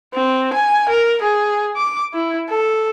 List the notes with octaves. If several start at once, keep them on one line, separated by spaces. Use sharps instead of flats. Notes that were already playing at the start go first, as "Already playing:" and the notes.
C4
G#5
A#4
G#4
D6
E4
A4